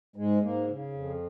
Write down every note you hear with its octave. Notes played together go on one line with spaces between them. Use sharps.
G#2 G#3
G#2 A#3
C#3
F2